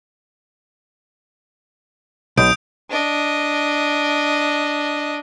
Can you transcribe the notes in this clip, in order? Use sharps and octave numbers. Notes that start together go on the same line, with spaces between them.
B1 D#6 G6 D7
D4 D#5